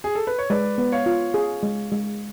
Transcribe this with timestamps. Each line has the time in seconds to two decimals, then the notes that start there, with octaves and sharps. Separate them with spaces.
0.04 G#4
0.15 A4
0.27 B4
0.38 C#5
0.50 G#3 B4 D5
0.78 B3
0.92 C#5 F5
1.06 F4
1.34 G#4
1.63 G#3
1.92 G#3